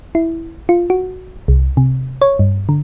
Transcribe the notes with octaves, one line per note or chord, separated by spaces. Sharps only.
E4
F4
F#4
C2
C3
C#5
G2
D3